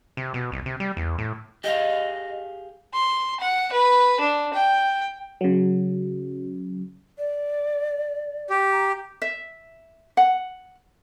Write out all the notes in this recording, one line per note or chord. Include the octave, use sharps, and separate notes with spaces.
C3
B2
C2
C3
G3
E2
A2
G4 G#4 D#5 F5
C6
F#5
B4
D4
G5
C#3 F#3
D5
G4
A#5
E5
F#5